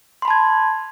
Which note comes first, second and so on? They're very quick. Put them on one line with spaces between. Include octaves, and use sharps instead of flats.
C6 B5 A5 G#6